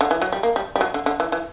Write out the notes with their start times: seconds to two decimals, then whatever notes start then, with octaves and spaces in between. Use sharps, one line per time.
0.01 D3
0.11 E3
0.22 F#3
0.32 G3
0.43 A#3
0.56 G3
0.76 G3
0.81 F#3
0.94 D3
1.06 D3
1.20 E3
1.32 E3